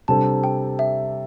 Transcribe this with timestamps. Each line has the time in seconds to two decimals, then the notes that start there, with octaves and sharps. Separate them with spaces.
0.08 C3 G3 D4 A4 C5 A5
0.44 G5
0.79 E5